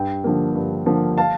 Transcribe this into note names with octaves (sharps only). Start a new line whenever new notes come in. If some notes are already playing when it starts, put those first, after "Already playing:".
Already playing: G2 G5
D3 F3 A#3
G2
D3 F3 A#3
F5 A5